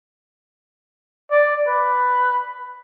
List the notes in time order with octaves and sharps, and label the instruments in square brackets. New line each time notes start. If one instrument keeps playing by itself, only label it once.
[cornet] D5
B4